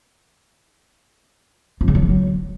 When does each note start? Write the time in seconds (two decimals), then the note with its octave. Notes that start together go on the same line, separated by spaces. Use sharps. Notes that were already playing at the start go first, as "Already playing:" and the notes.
1.81 F2
1.88 C#3
1.95 F#3
2.02 E3
2.09 F#3